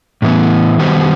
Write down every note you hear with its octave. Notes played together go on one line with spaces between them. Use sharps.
A2 E3 B3
D#3 G3 B3 F#4 C5